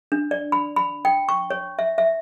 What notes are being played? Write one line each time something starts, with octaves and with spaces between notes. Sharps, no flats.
D4
D5
B5
B5
G5
C#6
C#5
E5
E5